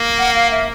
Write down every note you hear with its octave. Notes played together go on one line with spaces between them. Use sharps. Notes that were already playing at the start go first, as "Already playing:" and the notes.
Already playing: A#3
F#5
F5
E5